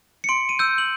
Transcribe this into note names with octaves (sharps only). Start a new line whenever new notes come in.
C#7
C6 D7
D#7
E6 G6
F#7